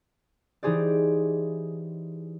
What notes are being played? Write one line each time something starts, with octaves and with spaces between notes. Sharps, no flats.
E3 D#4 G4 G#4 C5 D5